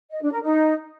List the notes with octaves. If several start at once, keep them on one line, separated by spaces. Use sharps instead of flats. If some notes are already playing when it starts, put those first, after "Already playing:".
D#5
D4
A#4
D#4